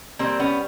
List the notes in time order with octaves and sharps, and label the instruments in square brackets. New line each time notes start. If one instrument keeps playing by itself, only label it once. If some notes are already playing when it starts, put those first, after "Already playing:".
[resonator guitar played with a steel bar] G3 A#3 C4
B3 C#4